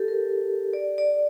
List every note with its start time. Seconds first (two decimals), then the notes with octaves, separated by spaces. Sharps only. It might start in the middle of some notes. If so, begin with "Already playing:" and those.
Already playing: G4 A4
0.08 A#4
0.73 D5
0.98 D5